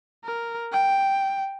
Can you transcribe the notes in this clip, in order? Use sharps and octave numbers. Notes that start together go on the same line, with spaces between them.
A#4
G5